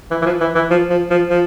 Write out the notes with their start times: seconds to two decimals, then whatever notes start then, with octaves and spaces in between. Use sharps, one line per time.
0.10 E3
0.22 E3
0.26 F3
0.40 E3
0.55 E3
0.70 F3
0.90 F3
1.10 F3
1.30 F3